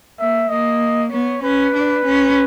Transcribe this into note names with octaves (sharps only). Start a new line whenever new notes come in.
A#3 E5
A#3 D#5
B3 C#5
C#4 B4
D4
C#4